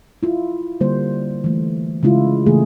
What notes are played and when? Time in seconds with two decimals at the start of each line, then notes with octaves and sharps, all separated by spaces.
0.23 E4 F4
0.80 D3 G3 A#3 C5
1.44 E3 A3
2.03 C#3 G#3 E4 F4
2.46 C#3 E3 A3 A#3 G#4